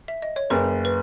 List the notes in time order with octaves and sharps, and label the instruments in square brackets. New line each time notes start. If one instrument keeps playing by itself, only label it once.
[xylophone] E5
D#5
C#5
[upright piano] F#1 [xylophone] B4
[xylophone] B4